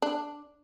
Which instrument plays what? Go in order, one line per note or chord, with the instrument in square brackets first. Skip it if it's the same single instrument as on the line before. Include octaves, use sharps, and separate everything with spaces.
[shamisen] D4